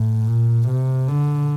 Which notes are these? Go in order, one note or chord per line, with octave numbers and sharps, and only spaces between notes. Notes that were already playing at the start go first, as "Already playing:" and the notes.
Already playing: A2
A#2
C3
D3